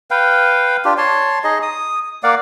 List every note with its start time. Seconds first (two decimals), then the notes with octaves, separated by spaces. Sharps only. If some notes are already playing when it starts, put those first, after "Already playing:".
0.11 B4 F5 G5
0.85 D4 F4 G4
0.98 C#5 A5 C6
1.44 D#4 G#4 D#5
1.62 D#6
2.23 A#3 D5 F5 F#5